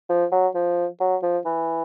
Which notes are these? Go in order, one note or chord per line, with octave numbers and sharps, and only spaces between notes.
F3
F#3
F3
F#3
F3
E3